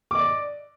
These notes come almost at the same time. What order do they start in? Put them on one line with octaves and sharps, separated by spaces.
D6 D#5 D5